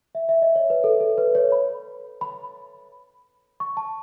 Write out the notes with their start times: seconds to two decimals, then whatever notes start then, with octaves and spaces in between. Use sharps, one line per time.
0.15 E5
0.29 E5
0.42 D#5
0.56 C#5
0.70 B4
0.84 A4
1.00 A4
1.18 B4
1.35 C#5
1.52 B5
2.21 B5
3.60 C#6
3.77 A5